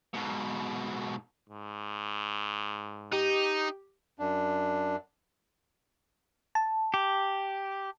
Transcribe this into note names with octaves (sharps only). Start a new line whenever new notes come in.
G#2 B2
G#2
D#4 G4
F#2 D4
A5
G4